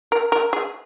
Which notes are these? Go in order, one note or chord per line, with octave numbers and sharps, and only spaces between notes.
A#4
A#4
G#4